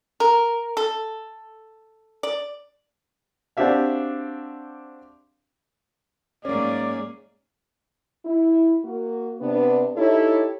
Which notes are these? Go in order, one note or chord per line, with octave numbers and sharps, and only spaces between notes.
A#4
A4
D5
C4 D4 F#4 G4 E5 F5
G#2 F#3 A#3 C#4 G#4 D5
E4
A#3 F#4
C3 B3 D4
D#4 E4 G4 A4 C#5